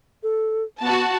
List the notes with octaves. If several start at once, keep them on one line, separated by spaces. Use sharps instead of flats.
A4
B3 F#4 A5